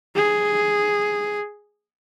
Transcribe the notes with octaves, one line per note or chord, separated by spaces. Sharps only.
G#4